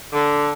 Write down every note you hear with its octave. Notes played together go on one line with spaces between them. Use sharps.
D3